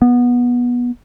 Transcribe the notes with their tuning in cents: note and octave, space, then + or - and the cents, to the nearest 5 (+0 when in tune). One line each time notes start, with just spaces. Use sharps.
B3 -20